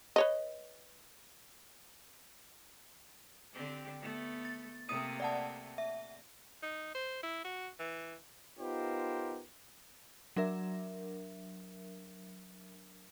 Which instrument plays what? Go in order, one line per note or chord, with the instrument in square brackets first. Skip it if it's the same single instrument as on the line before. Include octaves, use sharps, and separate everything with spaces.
[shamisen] B4 C#5 D#5
[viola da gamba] D3 C4 G4
A3 B3
[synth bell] A6
[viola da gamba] C3 A3 A#3 [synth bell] D#6 D#7
[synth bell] D5 F#5 A5
E5
[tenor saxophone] D#4
C5
E4
F#4
E3
[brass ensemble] B3 D#4 F4 G4 A#4 C5
[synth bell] F#3 D4 A#4 E5